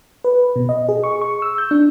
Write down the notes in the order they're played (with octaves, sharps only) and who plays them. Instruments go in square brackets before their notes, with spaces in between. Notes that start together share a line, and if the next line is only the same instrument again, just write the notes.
[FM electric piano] B4
B2
D#5
G#4
C#6
C#6
E6
G6
D4